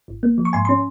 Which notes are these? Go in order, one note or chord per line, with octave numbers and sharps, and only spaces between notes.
G#1
A#3
F3
C#6
G#2 G#5 C6
C#4 C6